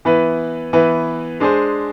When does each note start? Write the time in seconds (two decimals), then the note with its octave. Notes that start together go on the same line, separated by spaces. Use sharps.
0.05 E3 B3 E4 B4
0.73 E3 B3 E4 B4
1.40 G#3 D4 G#4 C5